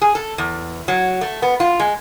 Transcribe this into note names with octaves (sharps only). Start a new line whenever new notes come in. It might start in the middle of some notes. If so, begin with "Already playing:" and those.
G#4
A4
E2
F#3
A3
B3
F4
G#3